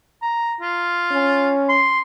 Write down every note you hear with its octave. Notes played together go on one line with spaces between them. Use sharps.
A#5
F4
C#4
C6